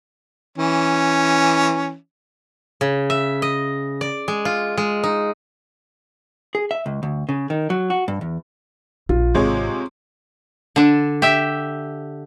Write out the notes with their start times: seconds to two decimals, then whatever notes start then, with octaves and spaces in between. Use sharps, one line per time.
0.58 E3 C#4
2.81 C#3
3.10 E5
3.42 D#5
4.01 D5
4.28 G#3
4.45 F4
4.77 G#3
5.03 D#4
6.55 G#4
6.71 E5
6.86 C#2
7.03 D2
7.29 C#3
7.50 D#3
7.70 F#3
7.90 F#4
8.08 G2
8.21 E2
9.09 A#1 F4
9.35 G#1 C3 G#3 C#5
10.76 D3 D4
11.22 G4 E5